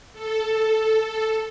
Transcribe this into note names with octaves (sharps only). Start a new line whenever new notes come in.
A4